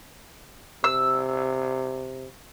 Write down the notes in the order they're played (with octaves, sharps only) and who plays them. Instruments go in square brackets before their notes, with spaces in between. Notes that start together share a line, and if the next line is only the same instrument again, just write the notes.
[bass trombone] C3 [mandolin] E6